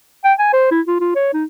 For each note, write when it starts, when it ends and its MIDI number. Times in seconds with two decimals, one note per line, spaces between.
0.24 0.33 79
0.39 0.52 80
0.53 0.67 72
0.71 0.81 64
0.87 0.96 65
1.00 1.14 65
1.16 1.29 73
1.33 1.44 63